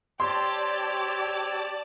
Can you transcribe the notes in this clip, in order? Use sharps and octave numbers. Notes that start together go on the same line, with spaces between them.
C4 G4 C#5 D5 A5 C6 E6